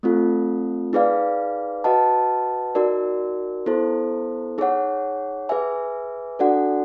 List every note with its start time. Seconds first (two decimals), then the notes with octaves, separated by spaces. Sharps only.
0.03 A3 C4 F4 A4
0.93 D#4 G#4 B4 D5 F5
1.84 F#4 B4 D#5 F#5 A5
2.75 D#4 F#4 A#4 D5
3.66 B3 E4 A4 C5
4.58 D#4 G#4 C#5 F#5
5.49 G#4 B4 E5 G#5
6.39 D4 F#4 A4 D5 F#5